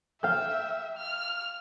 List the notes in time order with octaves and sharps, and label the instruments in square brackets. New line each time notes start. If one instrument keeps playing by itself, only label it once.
[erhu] E5 [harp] F5 G5 G6
[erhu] F6